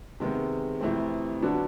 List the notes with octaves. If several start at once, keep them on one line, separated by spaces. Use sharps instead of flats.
C3 D#3 G#3 B3
F2 C3 E3 A3 C4
D3 F#3 B3 D4 F#4